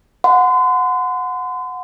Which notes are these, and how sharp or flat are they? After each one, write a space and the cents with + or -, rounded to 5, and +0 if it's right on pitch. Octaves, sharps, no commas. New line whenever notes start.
F#5 -20 C6 -40